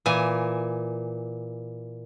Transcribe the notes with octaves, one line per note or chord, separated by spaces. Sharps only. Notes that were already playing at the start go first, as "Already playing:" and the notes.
A#2 E3 G#5